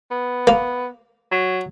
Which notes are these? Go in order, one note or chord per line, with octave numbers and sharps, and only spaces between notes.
B3
A#3
F#3